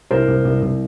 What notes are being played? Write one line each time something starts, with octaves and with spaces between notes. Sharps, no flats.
C2 A#4 C5
C2
C2
C2